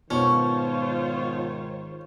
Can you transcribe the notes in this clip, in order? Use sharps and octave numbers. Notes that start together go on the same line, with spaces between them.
G#2 B2 D#3 C#4 F4 C5 C#5 C#6